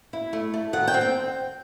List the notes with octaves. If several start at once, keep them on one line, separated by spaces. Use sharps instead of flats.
E4
A3
A3
D#3 F#5
G5
C4
G5